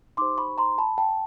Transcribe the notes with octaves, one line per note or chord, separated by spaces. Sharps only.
D#4 G4 C5 C6 D6
B5 C#6
A#5 C6
A5 B5
G5 A5